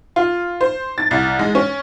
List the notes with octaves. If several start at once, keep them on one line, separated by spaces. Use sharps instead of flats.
F4
C5
A6
C2
G#3
C#4